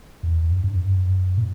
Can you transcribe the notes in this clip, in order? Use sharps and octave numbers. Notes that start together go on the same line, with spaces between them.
E2
F#2
G2
F#2
A#2